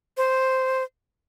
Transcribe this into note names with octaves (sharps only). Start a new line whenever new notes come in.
C5